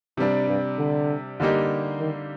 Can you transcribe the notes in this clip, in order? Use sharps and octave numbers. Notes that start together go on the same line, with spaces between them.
G2 C3 G3 D4
G2
D3
D3 G3 A#3 D#4 G4
D#3